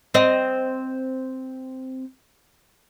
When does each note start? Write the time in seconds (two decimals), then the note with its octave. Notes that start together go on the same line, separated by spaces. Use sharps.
0.14 C4 D#5